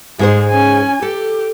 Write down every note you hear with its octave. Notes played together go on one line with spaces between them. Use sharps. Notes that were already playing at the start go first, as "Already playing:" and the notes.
G#2 G#3 G#4 C5
C#4 G#5
G4 A4